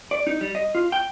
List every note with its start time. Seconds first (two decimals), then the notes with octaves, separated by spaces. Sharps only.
0.11 D5
0.27 D#4
0.41 G3
0.55 D#5
0.75 F4
0.92 G5